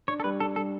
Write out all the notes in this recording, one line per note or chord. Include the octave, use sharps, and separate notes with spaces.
D4 C#5
A4
G3 B4
D4 A4
G3 A4